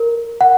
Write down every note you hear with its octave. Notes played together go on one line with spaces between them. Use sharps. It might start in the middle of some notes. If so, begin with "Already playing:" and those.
Already playing: A#4
F#5